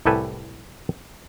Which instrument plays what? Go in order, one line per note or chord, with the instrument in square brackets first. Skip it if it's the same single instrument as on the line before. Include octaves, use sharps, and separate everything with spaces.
[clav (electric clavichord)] C2 A2 G4 A4 B4 G#5